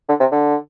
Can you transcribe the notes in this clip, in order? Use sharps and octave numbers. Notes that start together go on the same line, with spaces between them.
D3
C3
D3